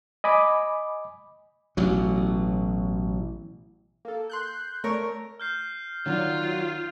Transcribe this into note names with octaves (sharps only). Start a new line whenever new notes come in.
D#5 G#5 B5 D6
A1 B2 F#3
A#3 A4
C6 F#6 G6
A3 A#4 C#5
F6 G6 C7
D#3 F#3 F4 D5 F#5